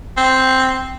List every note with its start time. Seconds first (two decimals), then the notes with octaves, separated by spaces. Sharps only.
0.17 C4